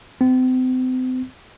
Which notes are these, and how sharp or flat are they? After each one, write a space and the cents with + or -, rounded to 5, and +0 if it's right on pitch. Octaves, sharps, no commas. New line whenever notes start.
C4 -35